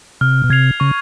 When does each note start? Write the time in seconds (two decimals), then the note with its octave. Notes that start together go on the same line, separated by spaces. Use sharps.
0.21 C3 F6
0.44 B2
0.50 C3 G#6 C7 F7
0.80 C#3 C#6